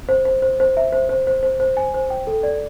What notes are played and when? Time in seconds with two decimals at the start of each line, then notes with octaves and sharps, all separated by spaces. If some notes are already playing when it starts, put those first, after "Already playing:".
0.09 C5
0.25 C5
0.42 C5
0.60 C5
0.77 E5
0.92 C5
1.09 C5
1.27 C5
1.43 C5
1.60 C5
1.77 G#5
1.94 C5
2.10 G5
2.27 A4
2.43 D5